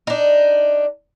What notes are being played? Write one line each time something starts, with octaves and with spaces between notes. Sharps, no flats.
D4 D#4